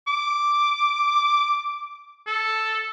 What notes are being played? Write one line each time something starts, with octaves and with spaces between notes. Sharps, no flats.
D6
A4